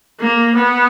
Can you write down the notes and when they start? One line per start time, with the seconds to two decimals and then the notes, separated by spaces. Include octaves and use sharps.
0.20 A#3
0.55 B3